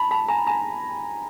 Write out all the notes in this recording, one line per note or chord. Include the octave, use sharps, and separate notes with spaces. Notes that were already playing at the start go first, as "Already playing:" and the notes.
Already playing: A5 B5
A5 B5
G#5 A#5
G#5 A#5